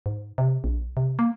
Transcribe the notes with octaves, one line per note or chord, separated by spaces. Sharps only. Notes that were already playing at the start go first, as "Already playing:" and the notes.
G#2
C3
A#1
C3
A#3